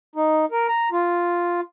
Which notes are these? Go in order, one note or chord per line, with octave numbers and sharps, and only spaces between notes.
D#4
A#4
A#5
F4